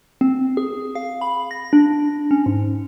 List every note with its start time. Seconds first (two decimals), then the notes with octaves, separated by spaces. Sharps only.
0.21 C4
0.57 G#4
0.95 F5
1.21 B5
1.51 A#6
1.73 D4
2.31 C#4
2.46 G#2